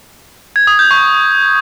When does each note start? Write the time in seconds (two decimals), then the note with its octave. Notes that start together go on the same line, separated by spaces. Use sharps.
0.56 G#6
0.67 D#6
0.79 G6
0.91 C#6